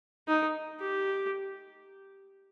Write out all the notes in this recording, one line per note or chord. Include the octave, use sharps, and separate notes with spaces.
D#4
G4